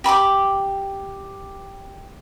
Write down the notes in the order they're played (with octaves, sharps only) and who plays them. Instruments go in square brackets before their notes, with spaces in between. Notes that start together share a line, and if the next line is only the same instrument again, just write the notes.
[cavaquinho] G4 B5 C#6 D6